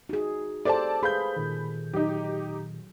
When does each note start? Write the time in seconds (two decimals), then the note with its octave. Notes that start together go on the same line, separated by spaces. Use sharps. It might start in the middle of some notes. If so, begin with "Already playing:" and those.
0.09 D#4 F#4 G#4
0.65 G4 A4 C5 D5 A5
1.03 G#4 B4 C5 F5 B5 G6
1.36 A#2 D#3
1.94 F#3 D#4 G4